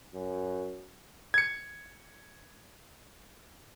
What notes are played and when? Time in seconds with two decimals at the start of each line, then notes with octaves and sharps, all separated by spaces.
0.14 F#2
1.34 G#6 C#7